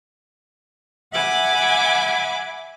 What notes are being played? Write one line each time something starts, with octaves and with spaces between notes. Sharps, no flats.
E5 F#5 G#5 B5 D6